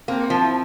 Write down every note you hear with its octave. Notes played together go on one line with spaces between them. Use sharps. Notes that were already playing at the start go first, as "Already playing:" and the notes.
A#3 C4
F3
E4